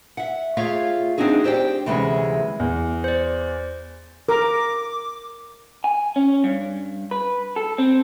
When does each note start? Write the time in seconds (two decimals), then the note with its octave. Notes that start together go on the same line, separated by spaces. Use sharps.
0.17 E5 F#5
0.57 A3 F4 G#4 C#5 E5 F5
1.18 C4 D4 D#4 F#4 G#4
1.44 G4 C5 D5 G5
1.86 D2 C3 E3 G3 G#3 C#4
2.60 E2
3.04 C5 D5
4.29 A#4 D6
5.84 G#5
6.16 C#4
6.44 G2
7.11 B4
7.56 A4
7.78 C4